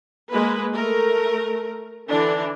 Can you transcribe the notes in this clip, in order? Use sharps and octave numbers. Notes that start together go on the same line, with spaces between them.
G#3 A#3 B4
A3 A#4
D3 E3 D4